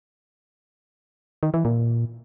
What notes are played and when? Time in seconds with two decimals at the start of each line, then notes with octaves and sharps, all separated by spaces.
1.43 D#3
1.54 E3
1.65 A#2